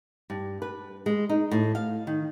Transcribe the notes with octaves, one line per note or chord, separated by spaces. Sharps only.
G2
B4
G#3
D#4
A2
F5
D#3